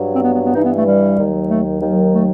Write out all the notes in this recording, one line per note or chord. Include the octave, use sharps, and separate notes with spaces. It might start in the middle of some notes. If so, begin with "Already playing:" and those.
Already playing: G2 F#3
C4
B3
B3
B3
G2 E3 D#4
B3
A3
G3
D#2 D#3 F#3
A3
D#2 D#3 F#3
A3